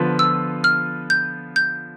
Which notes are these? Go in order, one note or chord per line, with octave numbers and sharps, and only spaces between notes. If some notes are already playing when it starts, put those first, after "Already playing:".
Already playing: D3 F3 B3 F4 B4
E6
F6
G6
G6